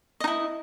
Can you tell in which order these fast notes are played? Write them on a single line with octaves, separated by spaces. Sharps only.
D#5 D#4 E4